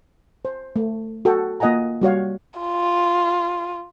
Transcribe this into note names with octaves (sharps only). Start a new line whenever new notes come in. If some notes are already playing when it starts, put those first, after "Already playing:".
C5
A3
F#4 A4 G5
A#3 F4 D#5 F#5 G#5 A#5
G3 F#4 C#5 F5
F4